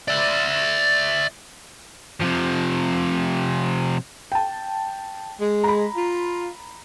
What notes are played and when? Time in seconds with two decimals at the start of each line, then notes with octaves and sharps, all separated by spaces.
0.08 D5 E5
2.20 C3 F3
4.32 G5 A5
5.40 G#3
5.64 A#5 B5
5.95 F4